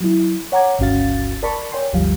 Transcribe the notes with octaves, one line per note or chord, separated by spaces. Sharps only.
F#3 E4
C#5 F#5 A#5 D6 G#6
G1 C#2 C#4 F#4 F5 A6
A#4 D5 A5 B5 C#6
C#5 G5 G#5 C6
G1 D2 F3 G3 F5